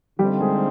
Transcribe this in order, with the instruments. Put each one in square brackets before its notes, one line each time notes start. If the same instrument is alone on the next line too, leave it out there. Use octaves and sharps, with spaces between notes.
[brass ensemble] D3 F3 A3 C4 D#4 [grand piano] G3 G4
[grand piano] G#3 G#4